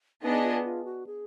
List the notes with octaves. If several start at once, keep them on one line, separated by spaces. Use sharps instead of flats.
B3 D4 D#4 G#4 D#5
F4
F4
F#4
G#4